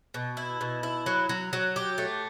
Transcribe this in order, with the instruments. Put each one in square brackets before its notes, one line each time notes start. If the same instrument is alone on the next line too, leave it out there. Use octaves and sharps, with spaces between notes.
[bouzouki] B2
E4
B2
E4
F#3
F#3
F#3
G4
A3